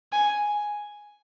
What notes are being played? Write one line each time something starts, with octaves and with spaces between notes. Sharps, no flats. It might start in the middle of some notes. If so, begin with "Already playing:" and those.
G#5